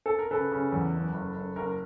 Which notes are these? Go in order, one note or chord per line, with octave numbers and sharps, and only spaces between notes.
A4
A#4
C#3 A4 B4
C#3
E2
F#1
F#1
F#1
F#1 A#4